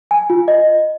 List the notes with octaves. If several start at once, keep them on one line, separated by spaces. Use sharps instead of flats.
G#5
F4
D#5